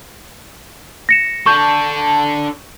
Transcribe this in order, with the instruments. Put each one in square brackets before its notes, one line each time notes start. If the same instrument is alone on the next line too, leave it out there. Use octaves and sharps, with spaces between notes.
[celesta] A#6 C#7 E7
[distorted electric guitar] D4 A4 [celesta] C#6 G6